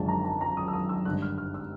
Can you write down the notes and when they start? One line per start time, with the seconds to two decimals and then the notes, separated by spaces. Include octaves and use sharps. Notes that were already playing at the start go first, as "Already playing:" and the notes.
Already playing: G#1 F#2 D3 F3 G#3 A5
0.08 A#5
0.24 A#5
0.41 A#5
0.57 D#6
0.68 E6
0.73 D#6
0.89 E6
1.05 G#1 G2 D3 F#6
1.22 F6
1.38 F6
1.54 E6